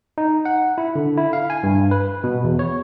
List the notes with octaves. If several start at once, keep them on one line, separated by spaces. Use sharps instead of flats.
D#4
F#5
E4
D3
E4
F5
G#5
G2
B4
B2
E2
C#5